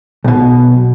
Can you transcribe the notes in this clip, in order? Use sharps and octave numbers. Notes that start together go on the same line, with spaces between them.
B1 B2